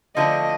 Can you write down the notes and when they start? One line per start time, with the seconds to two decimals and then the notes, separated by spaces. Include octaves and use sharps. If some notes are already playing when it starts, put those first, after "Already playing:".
0.16 D3 F3 A3 D4 D#5